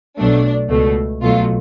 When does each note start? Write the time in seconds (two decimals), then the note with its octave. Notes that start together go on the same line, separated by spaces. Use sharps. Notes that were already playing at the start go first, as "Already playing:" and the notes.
0.18 B1 B2 F#3 A3 D4
0.70 C#2 B2 A3
1.22 B1 B2 F#3 A3 F4